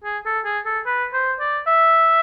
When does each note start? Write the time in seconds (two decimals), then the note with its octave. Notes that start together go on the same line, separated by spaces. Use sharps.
0.04 G#4
0.26 A4
0.45 G#4
0.65 A4
0.86 B4
1.13 C5
1.40 D5
1.67 E5